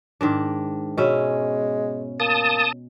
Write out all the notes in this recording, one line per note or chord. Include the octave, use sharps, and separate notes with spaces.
G#2 D#3 D4
B2 G#3 C#4 E5
A#3 A5 D#6